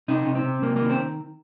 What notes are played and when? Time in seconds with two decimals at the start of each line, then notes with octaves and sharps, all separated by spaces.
0.08 C3 D#4
0.26 C3
0.35 C4
0.44 C3
0.62 C3 A#3
0.76 D#3 A#3
0.90 C4